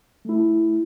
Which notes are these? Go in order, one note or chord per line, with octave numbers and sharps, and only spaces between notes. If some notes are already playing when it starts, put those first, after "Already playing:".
A3 E4